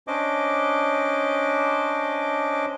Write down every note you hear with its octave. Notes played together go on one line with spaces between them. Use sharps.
C#4 D4 C5 D#5 D6